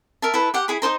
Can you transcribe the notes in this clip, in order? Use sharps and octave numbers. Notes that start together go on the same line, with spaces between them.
A#4 E5 A5
E4 A4 B4
G4 F#5
E4 G#4 B5
D#4 A4 C5 A#5